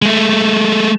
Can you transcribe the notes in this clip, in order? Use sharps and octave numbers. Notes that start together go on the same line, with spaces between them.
G#3 A3